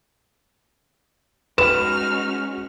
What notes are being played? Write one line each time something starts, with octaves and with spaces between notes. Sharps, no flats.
G#3 C#4 D#4 F#4 B4 F6 E7